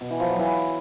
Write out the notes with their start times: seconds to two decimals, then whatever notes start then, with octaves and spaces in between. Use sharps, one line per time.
0.01 B2
0.10 E3
0.20 F3
0.30 F#3
0.39 E3